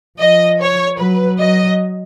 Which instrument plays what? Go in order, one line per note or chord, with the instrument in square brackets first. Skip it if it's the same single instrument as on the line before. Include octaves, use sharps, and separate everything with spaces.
[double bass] F3 [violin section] D#5
[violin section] C#5
[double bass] F#3 [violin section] B4
[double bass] F#3 [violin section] D#5